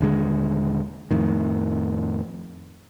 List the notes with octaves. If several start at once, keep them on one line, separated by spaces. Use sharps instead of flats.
D#1 D3 G#3
F2 A2 D#3